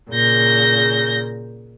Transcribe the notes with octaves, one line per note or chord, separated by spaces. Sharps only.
A#2 C#3 G6 A#6